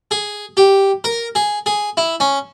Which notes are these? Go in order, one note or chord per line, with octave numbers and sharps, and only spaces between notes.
G#4
G4
A#4
G#4
G#4
E4
C#4